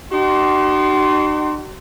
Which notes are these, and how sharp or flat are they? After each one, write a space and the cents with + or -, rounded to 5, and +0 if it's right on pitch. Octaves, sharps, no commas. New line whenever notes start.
D#4 -45 F#4 +45 C6 +0